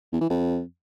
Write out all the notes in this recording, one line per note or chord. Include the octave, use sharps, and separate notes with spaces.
E2
E3
F2